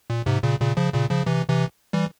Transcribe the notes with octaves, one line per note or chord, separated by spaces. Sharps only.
A#2
G#2 C3
A#2 C#3
A#2 C#3
C#3 F3
A#2 C#3
C#3 F3
C3 E3
C3 E3
E3 G3